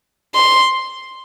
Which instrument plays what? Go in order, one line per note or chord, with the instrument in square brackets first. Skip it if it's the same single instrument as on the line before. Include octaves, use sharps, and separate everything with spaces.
[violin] C6